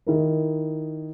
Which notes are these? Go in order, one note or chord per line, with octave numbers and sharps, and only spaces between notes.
D#3 E4 A#4